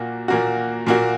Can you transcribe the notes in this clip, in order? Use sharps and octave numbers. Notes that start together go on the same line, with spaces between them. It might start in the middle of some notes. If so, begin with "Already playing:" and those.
Already playing: A#2 A#3 F#4
A#2 A#3 F#4
A#2 A#3 F#4